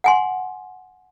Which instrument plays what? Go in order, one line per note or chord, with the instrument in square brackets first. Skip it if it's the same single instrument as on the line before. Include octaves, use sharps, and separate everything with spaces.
[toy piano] F#5 G#5 C6